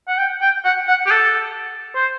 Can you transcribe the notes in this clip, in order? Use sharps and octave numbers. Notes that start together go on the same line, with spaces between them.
F#5
G5
G5
F#5
F#5
G4
A4
C5